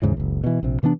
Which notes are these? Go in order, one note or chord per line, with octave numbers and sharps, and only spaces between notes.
D#2 G#2 C#3 E3
F#1 C#2
B2 E3
A#1 C3
C3 E3 B3 D4